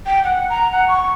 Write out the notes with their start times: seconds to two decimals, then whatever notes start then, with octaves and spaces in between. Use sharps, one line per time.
0.06 G5
0.24 F#5
0.50 A#5
0.72 F#5
0.88 C#6